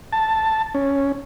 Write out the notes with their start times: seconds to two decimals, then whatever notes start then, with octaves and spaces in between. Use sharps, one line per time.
0.12 A5
0.75 C#4